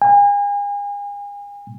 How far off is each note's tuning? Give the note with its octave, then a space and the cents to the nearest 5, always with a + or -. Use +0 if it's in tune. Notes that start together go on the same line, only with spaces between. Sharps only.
G#5 -40